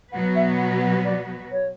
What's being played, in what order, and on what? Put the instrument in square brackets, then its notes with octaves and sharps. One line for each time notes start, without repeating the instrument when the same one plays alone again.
[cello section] B2 F#3 B3 F#4 B4 [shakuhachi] F#5
[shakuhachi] E5
F#5
F#5
D5
C#5